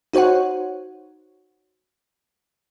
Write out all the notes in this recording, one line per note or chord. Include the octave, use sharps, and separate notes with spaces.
D#4 F#4 C5 C#5 F#5